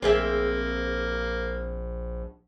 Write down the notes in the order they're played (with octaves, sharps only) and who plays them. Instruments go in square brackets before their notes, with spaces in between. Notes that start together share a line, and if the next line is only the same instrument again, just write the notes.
[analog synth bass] A#1 [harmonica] A#3 [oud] C4 G#4 E5